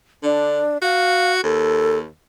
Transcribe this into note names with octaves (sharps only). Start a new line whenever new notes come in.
D3 D4
F#4 F5
D#2 A4